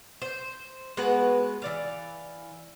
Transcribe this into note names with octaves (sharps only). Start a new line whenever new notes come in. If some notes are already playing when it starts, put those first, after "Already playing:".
C5
G#3 B3 F#4 B4
E3 D5 F5